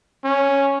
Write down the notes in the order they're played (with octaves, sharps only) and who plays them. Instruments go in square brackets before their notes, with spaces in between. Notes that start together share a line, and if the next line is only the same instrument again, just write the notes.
[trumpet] C#4